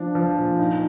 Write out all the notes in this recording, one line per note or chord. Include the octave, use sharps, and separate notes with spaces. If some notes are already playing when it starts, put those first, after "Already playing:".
Already playing: F3 D4
F3
A#2
D#4